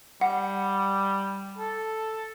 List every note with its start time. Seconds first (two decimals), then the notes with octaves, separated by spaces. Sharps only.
0.21 G3 F#5
1.58 A4